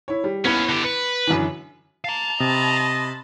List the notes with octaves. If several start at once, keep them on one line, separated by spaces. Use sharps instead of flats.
E4 C#5
G3
D#2 B3 C#4 E4 B5
D3 G4
B4 C#7
F#2 D3 E3
F5 A5 A#5
C3 D#5 A5 B5 C6